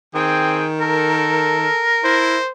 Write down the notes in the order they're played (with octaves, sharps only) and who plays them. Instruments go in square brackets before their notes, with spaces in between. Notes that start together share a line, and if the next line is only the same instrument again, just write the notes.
[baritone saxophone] D#3 [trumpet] C4 [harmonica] G#4 G5
[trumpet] A4 [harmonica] A#4
[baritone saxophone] E4 [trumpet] C5